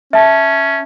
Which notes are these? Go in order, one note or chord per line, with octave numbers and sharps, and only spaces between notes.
C#4 E5 A5